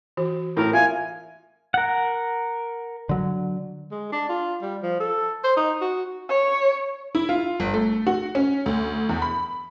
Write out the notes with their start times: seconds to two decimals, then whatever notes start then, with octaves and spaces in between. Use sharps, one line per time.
0.17 E3 F#4
0.57 A2 A#4
0.73 F4 E5 G#5
1.74 A#4 F#5
3.09 D3 F#3
3.91 G#3
4.12 D4
4.29 F4
4.62 G3
4.82 F3
5.00 A4
5.44 C5
5.57 D#4
5.81 F#4
6.29 C#5
7.15 E4
7.29 F4
7.60 G1
7.74 A3
8.07 F#4
8.35 C#4
8.66 D2
9.09 E2
9.22 B5